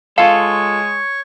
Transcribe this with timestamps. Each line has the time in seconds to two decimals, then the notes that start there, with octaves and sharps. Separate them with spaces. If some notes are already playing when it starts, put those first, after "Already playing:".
0.18 G#3 F4 A4 C#5 F5 C#6